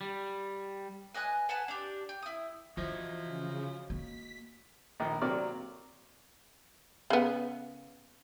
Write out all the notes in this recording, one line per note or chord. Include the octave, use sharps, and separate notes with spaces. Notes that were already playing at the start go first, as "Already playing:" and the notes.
G3
B4 D#5 G#5 F#6
B4 F#5 G#5 A5
D4 G4
G4
E4 D#6
E3 F3 F#4 D#5 E5
C#3
A#3 B6
A#1 D#3
C3 F#3 A#3 C#5 D5 F6
C#3 B3